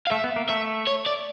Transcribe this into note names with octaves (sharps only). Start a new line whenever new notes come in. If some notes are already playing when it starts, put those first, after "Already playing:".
F5
A3 E5
B3
A#3
A3 E5
C#5
D5